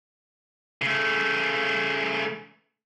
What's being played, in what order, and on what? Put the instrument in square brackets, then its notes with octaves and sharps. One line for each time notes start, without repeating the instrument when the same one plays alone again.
[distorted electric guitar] C#3 A3